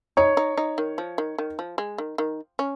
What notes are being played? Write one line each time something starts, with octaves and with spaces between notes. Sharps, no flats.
D#4 C#5
D#4
D#4
D#3
F3
D#3
D#3
F3
G#3
D#3
D#3
C#4